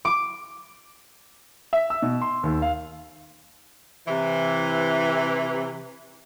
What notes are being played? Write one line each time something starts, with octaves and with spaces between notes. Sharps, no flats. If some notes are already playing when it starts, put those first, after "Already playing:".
D6
E5
E6
B2
C6
D#2
F5
C3 E3